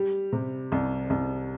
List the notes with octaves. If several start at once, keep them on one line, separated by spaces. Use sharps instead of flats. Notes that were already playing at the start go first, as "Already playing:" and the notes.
Already playing: G3 G4
C3
C2
C2